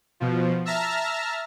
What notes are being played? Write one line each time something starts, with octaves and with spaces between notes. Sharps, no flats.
B2 F3
E5 A5 A#5 F6